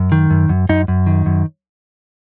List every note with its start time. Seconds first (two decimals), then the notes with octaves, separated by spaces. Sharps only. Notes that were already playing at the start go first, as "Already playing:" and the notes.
Already playing: F#2
0.12 D#3
0.30 F#2
0.49 F#2
0.69 F#2 D#4
0.88 F#2
1.07 D#3
1.26 F#2